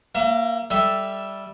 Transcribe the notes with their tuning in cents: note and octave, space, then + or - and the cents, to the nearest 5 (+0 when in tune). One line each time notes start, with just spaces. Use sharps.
A#3 +5 E5 +35
G3 +0 A4 +0 E5 +0